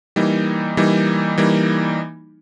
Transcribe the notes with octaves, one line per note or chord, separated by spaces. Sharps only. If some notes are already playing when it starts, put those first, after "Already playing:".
E3 G3 A#3 D#4
E3 G3 A#3 D#4
E3 G3 A#3 D#4